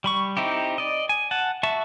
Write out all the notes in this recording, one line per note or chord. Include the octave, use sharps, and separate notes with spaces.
G3 B5 C#6
C4 D#4 E4 G4
D5 D#5
G#5
F#5 A5
F#4 E5 A5 C#6